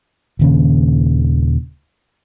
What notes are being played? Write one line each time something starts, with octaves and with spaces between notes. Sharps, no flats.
D#1 D#2 C#3